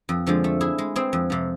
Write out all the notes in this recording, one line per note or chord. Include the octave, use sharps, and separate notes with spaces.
F2
D3 F3 G#3
A3
E4 G#4
G#3
C4 G#4
F2
C3 F3